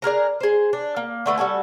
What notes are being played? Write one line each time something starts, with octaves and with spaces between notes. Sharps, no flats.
D4 G#4 A#4 A#5
G#4 C5
D4
A#3
D3 A3 B4
G3 F#4 A4 G#5